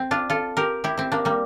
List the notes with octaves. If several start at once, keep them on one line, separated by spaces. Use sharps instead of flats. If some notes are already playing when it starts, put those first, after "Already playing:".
Already playing: C4
D4 F4
F4 A4
G4 A#4
E4 G4
C4 E4
A#3 D4
G3 A#3